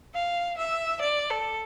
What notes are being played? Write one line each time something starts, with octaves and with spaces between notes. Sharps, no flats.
F5
E5
D5
A4